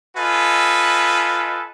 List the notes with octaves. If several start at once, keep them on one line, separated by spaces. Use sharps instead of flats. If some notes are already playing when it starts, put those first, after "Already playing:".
F4 A4 B4 D#5 G#5